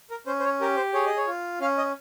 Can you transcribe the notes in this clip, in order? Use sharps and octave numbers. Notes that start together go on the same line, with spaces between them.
A#4
C#4 C5
C5
C#5
G4 A#4
C5
G#4 C#5
D#5
C#5
F4
C#4 F5
D#5